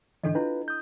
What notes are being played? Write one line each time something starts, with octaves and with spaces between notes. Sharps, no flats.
G#2 D3 E3 D4 A4 D#5
D4 E4 F4 B4
D#6 G6